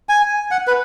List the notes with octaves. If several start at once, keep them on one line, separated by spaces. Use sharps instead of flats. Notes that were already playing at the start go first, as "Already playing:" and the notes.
G#5
F#5
B4